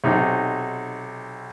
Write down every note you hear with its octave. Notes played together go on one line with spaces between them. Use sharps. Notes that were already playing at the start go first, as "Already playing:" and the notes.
B1 C3 D#4